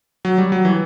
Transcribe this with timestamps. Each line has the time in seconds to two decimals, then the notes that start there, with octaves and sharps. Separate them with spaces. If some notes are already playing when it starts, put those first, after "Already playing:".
0.25 F#3
0.38 G3
0.52 F#3
0.65 E3